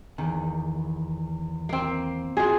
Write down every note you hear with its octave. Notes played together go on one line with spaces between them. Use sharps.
E2 D#3
A#3 C4
F4 F#4 G#4